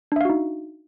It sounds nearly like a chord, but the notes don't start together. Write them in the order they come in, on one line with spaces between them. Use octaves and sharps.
D4 E5 F5 F#4 D#4